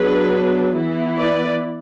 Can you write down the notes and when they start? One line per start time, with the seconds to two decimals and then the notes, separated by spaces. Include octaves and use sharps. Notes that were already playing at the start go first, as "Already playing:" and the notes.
Already playing: F#3 B3 D4 G#4 B4
0.76 E3 B3 E4
1.17 B4 D5